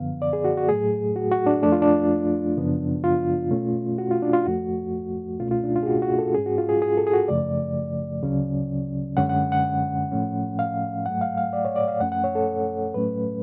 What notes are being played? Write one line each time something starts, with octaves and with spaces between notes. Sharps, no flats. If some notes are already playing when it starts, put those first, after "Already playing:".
Already playing: F#2 D3 F3 B3 F5
D5
G#4
F#4
F#4
A2 F#3 A3 G#4
F#4
F#4
D4
F2 F3 A3 D4
F4
D4
F#2 C#3 F3 B3
F4
B2 A3 C#4
F#4
F4
D4
F4
F2 F3 A3 F#4
C#2 B2 A3 C#4 F4
F4
D4
F4
G#4
F#4
F#4
A4
G#2 G#3 C#4 G#4
F#4
F4
G#4
G#4
A4
G#4
F#4
F#2 C#3 F3 A3 D5
D2 C#3 F#3 C#4
F#2 D3 G#3 C#4 F#5
F#5
F#5
A2 F3 A3 C#4
F5
G#2 F#3 A3 F#5
F5
F5
D5
C#5
D5
F5
F#2 F3 A3 C#4 F#5
F#5
C#5
A4
A2 F#3 A3 C#4 B4